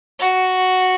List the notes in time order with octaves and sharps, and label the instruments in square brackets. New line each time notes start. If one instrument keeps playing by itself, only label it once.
[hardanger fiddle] F#4